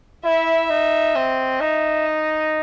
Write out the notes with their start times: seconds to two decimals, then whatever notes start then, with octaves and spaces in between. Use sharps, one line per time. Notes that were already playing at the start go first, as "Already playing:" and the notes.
0.24 E4 E5
0.70 D#4
1.15 C4 D#5
1.60 D#4 E5
2.06 D#5